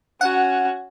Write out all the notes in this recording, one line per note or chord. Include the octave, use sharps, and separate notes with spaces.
C#4 F#4 F#5